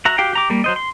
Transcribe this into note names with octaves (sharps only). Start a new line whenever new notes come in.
F#4 E5 A#5
F#4 G4 F5 G5
G4 A#5 D6
G3 A#3
F#3 C5 D#5
C6